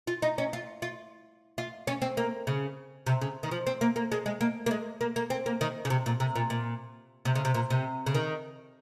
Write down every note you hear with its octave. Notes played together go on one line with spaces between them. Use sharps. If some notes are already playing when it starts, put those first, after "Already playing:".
F4
D#4
C#4
F4
F4
F4
C#4
C4
A#3
C#3
C3
C#3
D#3
F3
C4
A#3
A#3
G#3
G#3
A#3
A#3
G#3
A#3
A#3
C4
A#3
D#3
C#3
C3
A#2
C3
A#2
A#2
C3
C#3
C3
A#2
C3
C#3
D#3